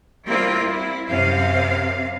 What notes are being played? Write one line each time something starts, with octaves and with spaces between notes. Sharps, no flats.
G3 A#3 C4 E4 F4
E4
F#2 C3 F5